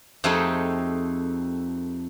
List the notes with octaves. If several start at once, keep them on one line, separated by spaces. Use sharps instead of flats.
F2 A3 C4 D#4 G4 G#4